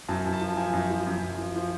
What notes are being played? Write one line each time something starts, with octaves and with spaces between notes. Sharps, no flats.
F#2 A5
F#2
A5
F3
F3 G#5
F#2
F3
F#2
F#2
F3
F3